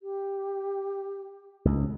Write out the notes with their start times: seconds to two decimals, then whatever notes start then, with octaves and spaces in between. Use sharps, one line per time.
0.01 G4
1.65 C#2